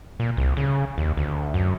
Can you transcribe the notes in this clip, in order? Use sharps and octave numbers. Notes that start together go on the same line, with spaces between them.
A#2
C2
C#3
D#2
D2
F#2